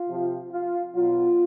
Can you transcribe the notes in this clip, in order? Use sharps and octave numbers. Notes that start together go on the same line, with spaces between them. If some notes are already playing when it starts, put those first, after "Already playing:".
Already playing: F4
C3 F3
F4
B2 F#3 F4